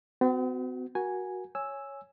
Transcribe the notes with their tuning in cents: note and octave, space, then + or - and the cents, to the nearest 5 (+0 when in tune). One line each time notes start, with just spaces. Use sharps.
C4 -45 F#4 +0
F#4 +0 A#4 +30 G#5 +0
C#5 +0 G#5 +0 E6 +0